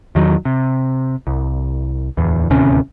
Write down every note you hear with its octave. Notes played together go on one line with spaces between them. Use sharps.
E2 D#3 F#3
C3
C2
D1 E2
D1 D#2 C3 C#4